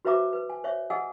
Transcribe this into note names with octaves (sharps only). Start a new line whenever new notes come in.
F#4 B4 C5 E5 A#5 D6
B4
G#5
C5 C#5 E5
G#4 D#5 F#5 G#5 D#6 E6